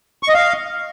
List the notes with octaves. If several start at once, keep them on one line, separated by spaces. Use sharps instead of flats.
C#6
D#5
F5